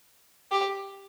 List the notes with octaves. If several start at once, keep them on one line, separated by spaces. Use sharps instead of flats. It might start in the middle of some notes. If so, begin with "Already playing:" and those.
G4